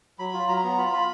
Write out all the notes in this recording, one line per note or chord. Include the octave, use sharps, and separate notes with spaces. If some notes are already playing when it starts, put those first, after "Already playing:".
F#3 B5
F4
F#3 A#5
B3
F4 B5
F4 B5